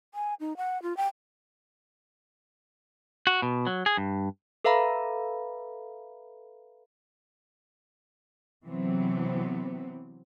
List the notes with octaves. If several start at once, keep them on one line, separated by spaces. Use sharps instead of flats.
G#5
D#4
F#5
F4
G5
F#4
B2
F#3
G#4
G2
A4 B4 E5 F5 A#5 B5
C3 E3 F#3 B3 C4